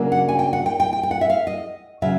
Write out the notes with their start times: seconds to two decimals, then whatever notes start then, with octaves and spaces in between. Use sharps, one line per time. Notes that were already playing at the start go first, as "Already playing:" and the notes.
Already playing: C#3 F#3 A#3 D4
0.12 F#5
0.29 G#5
0.39 G5
0.53 F#5
0.66 G5
0.80 G5
0.93 G5
1.03 G5
1.11 F#5
1.21 E5
1.30 F5
1.47 D#5
2.02 C#3 F#3 E5